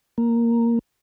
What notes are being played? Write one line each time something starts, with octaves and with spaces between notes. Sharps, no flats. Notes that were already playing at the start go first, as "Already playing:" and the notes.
A#3